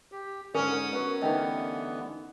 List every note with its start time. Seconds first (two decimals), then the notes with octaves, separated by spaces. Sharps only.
0.12 G4
0.55 G#2 D3 C#4 A#4 D#6
0.93 B3 F#4 A#4
1.22 D3 E3 A3 B3 D#4 G4 A#4 D#5